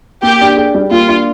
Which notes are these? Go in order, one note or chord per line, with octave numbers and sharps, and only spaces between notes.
A#3 G4
D4
G#4
G3
A#3 F4
D4